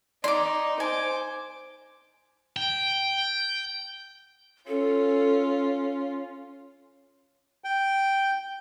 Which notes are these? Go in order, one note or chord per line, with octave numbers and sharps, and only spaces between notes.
D#4 D5 C6 D6
C5 G#5 D6
G5
C#4 F4 A4
G5